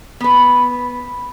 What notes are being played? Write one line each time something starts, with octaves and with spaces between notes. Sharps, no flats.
B3 B4